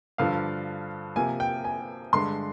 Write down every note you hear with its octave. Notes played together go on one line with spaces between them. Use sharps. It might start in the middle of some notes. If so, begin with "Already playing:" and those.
G2 D3 F3 F5
C3 F3 A#3 G#5
G5
G#5
G2 D3 G#3 C6